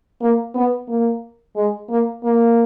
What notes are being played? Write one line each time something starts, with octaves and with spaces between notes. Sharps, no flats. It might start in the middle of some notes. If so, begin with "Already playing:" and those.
A#3
B3
A#3
G#3
A#3
A#3